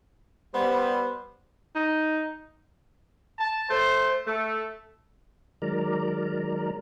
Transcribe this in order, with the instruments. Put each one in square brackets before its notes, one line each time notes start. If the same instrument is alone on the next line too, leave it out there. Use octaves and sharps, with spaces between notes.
[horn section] G3 B3 C5 [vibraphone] B5
[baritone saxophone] D#4
[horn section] A5
A3 C5
A3
[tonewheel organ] D#3 F#3 G#3 A#4 D5 A#5